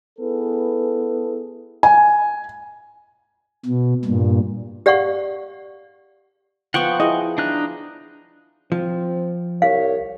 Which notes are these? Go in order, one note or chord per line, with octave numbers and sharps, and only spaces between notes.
B3 E4 G#4 A4 B4
G#5
B2
G2 A#2
G4 D5 F5 F#5 C#6
F3 B3 F#5 G5 C#6
E4 G#4 D#5
D4 D#4 F#6
F3 C4
C2 C#5 F5